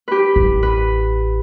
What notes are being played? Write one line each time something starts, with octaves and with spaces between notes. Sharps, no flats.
G4 B4
A1
B4